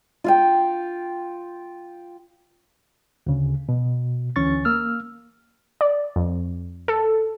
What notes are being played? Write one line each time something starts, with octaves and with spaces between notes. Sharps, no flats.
F4 F5 G5
D2 C#3
B2
D2 E3 C#4 C#6 A6
A#3 E6 F6
D5
F2
A4